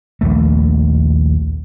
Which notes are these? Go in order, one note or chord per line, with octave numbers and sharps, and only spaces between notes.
A#1 D#2 A3